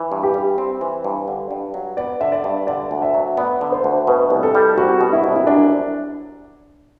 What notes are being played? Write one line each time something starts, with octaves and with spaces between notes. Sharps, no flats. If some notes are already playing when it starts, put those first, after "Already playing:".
Already playing: E3
G2
G4
G3
C4
E3
G2
D3
G2
F#3
B3 D5
D3 E5
D5
G2
D3 D5
D2
E5
F#3
B3 D5
D3
C5
D2
B2 B4
C2
A4
G3
C2 F#4
B2
E4
C2
E4
F#2 D4